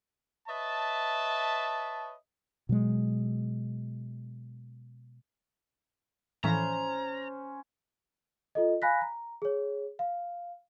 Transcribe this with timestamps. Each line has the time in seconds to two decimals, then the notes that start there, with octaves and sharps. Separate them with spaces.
0.48 B4 C#5 D#5 E5 A5
2.69 B2 F#3 G#3
6.44 A2 E3 F3 C#4 C5 A#5
8.55 F4 A4 D#5
8.82 F5 G#5 B5 F#6 A#6 B6
9.01 A#5
9.42 G#4 C#5
9.99 F5